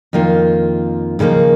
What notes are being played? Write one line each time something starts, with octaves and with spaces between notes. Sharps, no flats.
F2 D#3 A#3 F4
D#2 C#3 F3 A#3 D#4